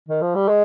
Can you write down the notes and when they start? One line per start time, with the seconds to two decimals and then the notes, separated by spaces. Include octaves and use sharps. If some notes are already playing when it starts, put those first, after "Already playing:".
0.08 D#3
0.21 F3
0.35 G3
0.48 G#3